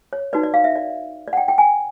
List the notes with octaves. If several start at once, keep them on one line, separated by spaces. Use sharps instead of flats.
C#5
D#4 F#4 B4 D5
D5
F5
E5
D5
D5
F#5
G5
G5
G#5